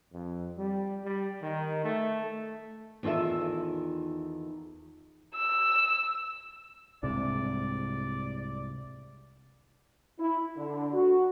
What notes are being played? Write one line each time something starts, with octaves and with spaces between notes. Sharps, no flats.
F2
G3
G3
D#3
A3
E2 D#3 F4 A4 E5
E6
C2 G#2 C3 D5
E4
D3
F#4